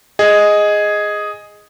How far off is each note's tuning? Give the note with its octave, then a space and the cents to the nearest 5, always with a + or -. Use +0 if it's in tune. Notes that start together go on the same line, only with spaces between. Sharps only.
G#4 +0 D#5 +0